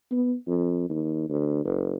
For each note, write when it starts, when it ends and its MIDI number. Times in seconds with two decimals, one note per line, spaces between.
0.11 0.34 59
0.48 0.86 41
0.90 1.27 39
1.29 1.64 38
1.65 1.97 30